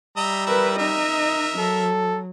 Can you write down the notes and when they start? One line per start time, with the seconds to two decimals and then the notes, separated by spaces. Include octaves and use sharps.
0.17 G3 D#5 E5 A#5
0.47 E4 A#4 B4 E5
0.78 D#4 A#4 D#5 E5
1.58 F#3 A4